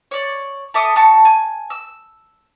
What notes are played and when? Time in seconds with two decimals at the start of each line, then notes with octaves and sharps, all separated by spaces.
0.11 C#5 D5
0.74 A4 E5 D6 D#6
0.96 F#4 A5 C#6
1.25 G#5
1.70 E6